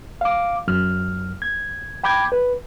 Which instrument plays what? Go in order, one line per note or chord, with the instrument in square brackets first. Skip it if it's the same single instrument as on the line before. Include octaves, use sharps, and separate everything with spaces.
[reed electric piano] F5 D6
F#2 F6
G#6
G5 B5 D6 G6 G#6
B4